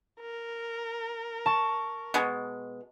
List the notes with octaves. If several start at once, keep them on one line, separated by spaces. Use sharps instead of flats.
A#4
A5 C#6
B2 G#3